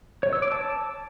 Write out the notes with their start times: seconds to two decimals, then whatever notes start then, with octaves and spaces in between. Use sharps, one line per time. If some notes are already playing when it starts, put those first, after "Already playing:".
0.23 C#5
0.33 E6
0.42 D6
0.52 A5